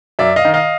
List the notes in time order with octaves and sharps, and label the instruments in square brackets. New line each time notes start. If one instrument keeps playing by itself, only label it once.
[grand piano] F#2 D5 E5
D#5 F5
D#3
D#5 F5